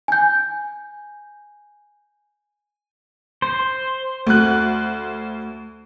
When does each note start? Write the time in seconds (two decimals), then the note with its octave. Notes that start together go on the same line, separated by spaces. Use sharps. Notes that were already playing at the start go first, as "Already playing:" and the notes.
0.08 G#5 G6
3.42 C5
4.27 D2 A3 F#6